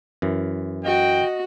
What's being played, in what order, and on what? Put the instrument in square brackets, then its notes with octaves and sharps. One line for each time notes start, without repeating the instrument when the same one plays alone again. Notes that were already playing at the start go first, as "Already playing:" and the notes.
[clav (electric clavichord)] F#2 E3
[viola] F#4 [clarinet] D#5 [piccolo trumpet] G5